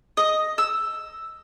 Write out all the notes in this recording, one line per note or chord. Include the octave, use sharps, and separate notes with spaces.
D#5
E6